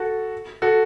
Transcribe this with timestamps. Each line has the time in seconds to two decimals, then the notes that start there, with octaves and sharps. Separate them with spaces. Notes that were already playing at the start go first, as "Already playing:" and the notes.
Already playing: F#4 A4
0.62 F#4 A4